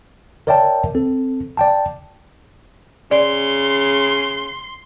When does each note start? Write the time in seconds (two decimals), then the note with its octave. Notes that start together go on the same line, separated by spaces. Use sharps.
0.47 A#4 C#5 D5 E5 G5 A5
0.95 C4 A4
1.57 D5 G5 A5
3.11 C#3 D5 C6